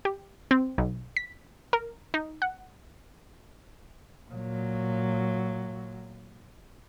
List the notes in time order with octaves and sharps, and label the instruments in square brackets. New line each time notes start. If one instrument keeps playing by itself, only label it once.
[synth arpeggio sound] G4
C4
B1
B6
A#4
D#4
F#5
[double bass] A#2 F#3